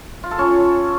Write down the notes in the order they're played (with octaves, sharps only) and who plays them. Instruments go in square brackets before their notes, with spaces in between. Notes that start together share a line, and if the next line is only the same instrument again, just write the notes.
[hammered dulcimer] F4
A4
C#4